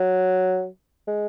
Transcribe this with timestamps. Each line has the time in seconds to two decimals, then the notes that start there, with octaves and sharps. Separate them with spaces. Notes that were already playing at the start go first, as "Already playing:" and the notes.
Already playing: F#3
1.08 G#3